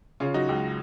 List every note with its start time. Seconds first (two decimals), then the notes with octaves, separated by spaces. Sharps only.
0.20 C#3 C#4 F4
0.34 F#3 D#4 F#4
0.49 C#2